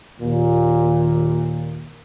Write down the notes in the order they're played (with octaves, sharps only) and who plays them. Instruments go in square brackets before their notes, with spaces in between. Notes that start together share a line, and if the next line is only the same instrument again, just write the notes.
[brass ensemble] D#2 A#2